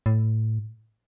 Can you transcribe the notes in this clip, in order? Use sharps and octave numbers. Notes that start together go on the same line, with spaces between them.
A2